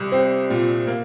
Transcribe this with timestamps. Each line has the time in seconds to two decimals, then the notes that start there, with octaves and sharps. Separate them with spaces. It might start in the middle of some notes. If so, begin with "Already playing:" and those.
Already playing: C2 G3
0.12 C4
0.50 A#2
0.87 A#3